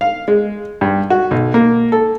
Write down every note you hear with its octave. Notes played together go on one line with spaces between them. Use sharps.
F5
G#3
G2
F#4
B1
A#3
A4